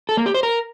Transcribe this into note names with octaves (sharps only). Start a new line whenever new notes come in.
A4
A#3
G4
C5
A#4